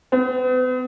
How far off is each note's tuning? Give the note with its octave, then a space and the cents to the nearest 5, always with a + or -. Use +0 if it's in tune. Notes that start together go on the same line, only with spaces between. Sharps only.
B3 +45